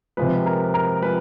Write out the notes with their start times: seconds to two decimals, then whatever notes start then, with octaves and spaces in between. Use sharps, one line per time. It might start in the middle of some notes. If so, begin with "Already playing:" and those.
0.17 C3 F3 G#3 B4
0.46 A#4
0.74 A#4
1.02 F3 G#3 B4